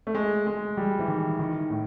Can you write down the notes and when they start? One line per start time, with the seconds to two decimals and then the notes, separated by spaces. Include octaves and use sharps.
0.07 A3
0.15 G#3
0.47 G#3
0.77 G3
0.99 E3
1.08 D#3
1.39 D#3
1.70 A2